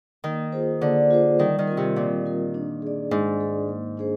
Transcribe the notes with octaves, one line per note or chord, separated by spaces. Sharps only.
D#3 A#3
F4 G#4 C5
D3 A#3
F4 G#4 C5
D#3 G3
D#3
C4 F4 A#4
C3
A#2 G3
C4 F4 A#4
D4
G#4 D5
G#2 D4
G#4 D5
A#3
D4 G#4 C5